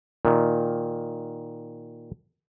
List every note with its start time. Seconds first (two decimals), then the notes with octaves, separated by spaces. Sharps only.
0.25 A#2 D#3